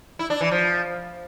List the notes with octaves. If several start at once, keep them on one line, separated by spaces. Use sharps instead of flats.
E4
D4
E3
F3